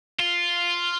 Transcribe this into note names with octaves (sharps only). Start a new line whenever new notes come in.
F4